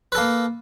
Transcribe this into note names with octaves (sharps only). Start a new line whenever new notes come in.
A#3 A4 B4